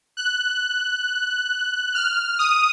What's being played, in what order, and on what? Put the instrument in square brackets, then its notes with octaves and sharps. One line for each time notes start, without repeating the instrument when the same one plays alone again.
[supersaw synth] F#6
F6
D#6